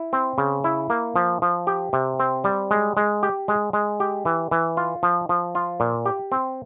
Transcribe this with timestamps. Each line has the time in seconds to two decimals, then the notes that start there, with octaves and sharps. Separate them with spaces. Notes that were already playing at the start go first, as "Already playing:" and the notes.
Already playing: E4
0.13 C4
0.38 C#3
0.64 E4
0.90 A#3
1.16 F3
1.42 F3
1.67 G4
1.93 C3
2.20 C4
2.44 G3
2.71 G#3
2.97 G#3
3.23 G4
3.48 G#3
3.73 G#3
4.00 G4
4.25 E3
4.51 E3
4.77 F4
5.03 F3
5.29 F3
5.55 F4
5.80 A#2
6.06 G4
6.32 C4